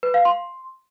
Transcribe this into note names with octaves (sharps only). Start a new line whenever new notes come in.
B4
F5
C6